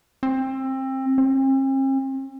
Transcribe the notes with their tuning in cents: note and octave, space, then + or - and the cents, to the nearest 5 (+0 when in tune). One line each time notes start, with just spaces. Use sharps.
C4 +25
C4 +45